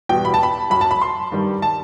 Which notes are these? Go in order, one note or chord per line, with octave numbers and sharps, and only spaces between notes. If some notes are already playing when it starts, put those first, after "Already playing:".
E2 B2 G3 G5
B5
A5
B5
F#2 F#3 B5
A5
B5
C6
G2 D#3 G3
A5